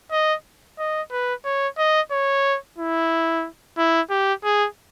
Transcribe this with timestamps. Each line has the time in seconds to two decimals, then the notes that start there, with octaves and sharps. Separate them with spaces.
0.12 D#5
0.79 D#5
1.11 B4
1.45 C#5
1.78 D#5
2.12 C#5
2.78 E4
3.78 E4
4.10 G4
4.44 G#4